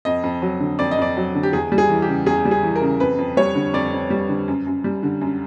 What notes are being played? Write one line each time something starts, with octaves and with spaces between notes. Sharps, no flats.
F2 D#5
F2
F#3
D3
F2 D5
D#5
F2 D5
F#3
D3
G4
E2 G#4
G3
G#4
E3
G4
C#3
E2 G#4
G3
G#4
E3
A#4
C#3
F2 B4
F2
G3 C#5
D3
F2 D5
F2
G3
D3
F#2
F#2
G3
D3
F#2